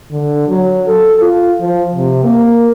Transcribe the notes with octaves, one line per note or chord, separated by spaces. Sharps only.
D3
F#3
A4
F4
F3
C3
A#3